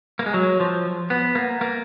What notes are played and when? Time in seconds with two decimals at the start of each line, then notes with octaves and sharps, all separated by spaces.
0.19 A#3
0.26 G#3
0.34 F#3
0.60 F3
1.10 B3
1.35 A#3
1.61 A#3